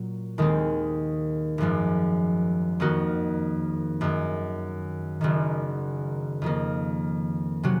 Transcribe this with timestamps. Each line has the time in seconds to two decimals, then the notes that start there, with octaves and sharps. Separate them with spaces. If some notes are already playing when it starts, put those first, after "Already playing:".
Already playing: A#2 F#3
0.38 D#2 D#3 G#3 C4
1.58 G#1 F#2 F3 G#3
2.80 F2 D#3 A#3 D#4 F#4
4.01 F#2 D#3 G#3
5.21 F#1 F#2 D#3
6.42 F2 D#3 A#3
7.63 C3 F#3 C#4 F#4